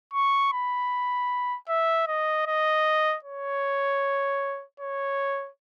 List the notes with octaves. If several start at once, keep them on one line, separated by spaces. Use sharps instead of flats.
C#6
B5
E5
D#5
D#5
C#5
C#5